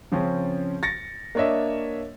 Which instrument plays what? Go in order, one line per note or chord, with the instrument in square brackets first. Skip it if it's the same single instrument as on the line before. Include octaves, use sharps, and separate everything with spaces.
[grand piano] C#3 F3 C4 C#4
A6 A#6 C#7
A#3 D4 C#5 D#5 E5